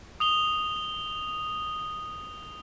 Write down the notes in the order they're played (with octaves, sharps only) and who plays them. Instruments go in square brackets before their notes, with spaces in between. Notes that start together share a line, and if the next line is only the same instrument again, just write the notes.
[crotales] D#6 F7 G7